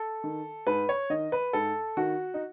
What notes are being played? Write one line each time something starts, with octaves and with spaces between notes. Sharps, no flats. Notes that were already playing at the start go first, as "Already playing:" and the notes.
Already playing: A4
D#3
G#2 B4
C#5
D#3 D#5
B4
G#2 A4
D#3 F#4
D#4